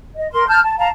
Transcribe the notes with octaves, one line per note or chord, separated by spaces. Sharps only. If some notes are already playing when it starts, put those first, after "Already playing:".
D#5
A#4 C6
A5 F6 G6
A5
F5 A5 A#5